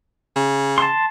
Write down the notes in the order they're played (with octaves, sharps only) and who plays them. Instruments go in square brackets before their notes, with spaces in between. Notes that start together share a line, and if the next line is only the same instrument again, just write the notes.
[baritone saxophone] C#3
[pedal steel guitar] A5 C6